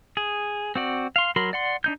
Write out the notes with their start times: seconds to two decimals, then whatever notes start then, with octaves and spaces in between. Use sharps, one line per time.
0.17 G#4
0.75 C4 F#4 D5
1.16 F5 C6
1.36 F#3 F#4 A#4 B5 C6
1.53 D5 F#5 C6
1.84 D4 D#4 G6